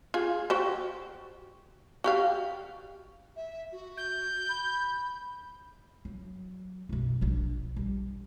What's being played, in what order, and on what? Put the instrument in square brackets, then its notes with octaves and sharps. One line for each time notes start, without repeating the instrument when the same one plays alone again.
[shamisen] F4 G#4
F#4 G4 C5
F#4 G4 F5
[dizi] E5
F#4
[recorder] G6
[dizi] B5
[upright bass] F#3
B1 F#2
A#1 D4
G3